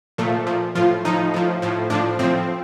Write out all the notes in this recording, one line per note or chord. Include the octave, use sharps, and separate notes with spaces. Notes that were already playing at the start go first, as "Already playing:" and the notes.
A#2 F3 A3
A#2 F3
A2 F3 F4
A2 F3 D#4
A2 F3
A2 F3
A2 F3 D4
A2 F3 C4